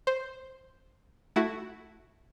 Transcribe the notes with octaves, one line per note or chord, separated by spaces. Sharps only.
C5
A3 E4 F#4